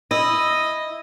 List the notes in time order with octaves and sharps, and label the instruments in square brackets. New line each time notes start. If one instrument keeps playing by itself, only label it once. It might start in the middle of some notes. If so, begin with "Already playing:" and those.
[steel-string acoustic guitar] E4 [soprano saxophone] D#5